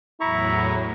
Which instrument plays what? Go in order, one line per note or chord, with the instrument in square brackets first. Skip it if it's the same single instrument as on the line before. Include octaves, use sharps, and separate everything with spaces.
[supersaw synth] E2 A2 F#3 [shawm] E4 [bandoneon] A#5 C#6